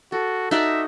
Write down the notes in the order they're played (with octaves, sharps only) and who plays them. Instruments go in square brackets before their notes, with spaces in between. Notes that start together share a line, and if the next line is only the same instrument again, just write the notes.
[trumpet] F#4 [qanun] A4
[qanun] D#4 F#4 D5 [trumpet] E5